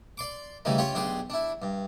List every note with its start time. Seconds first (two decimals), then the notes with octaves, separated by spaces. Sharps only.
0.18 D5 C6 D6
0.65 C#3 E3 G3 A3 D#4
0.78 C#4 F4 G4 C#5
0.95 B1 D4 G4 G#4 C6
1.30 D4 E4
1.62 G2